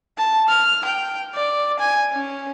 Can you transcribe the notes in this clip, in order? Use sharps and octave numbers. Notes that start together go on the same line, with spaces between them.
A5
F6
G5
D5
G#5
C#4